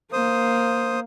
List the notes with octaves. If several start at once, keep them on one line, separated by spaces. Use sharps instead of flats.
A#3 C5 D#6